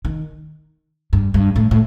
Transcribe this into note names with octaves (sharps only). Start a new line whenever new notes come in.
D#3
G2
G2
A2
A2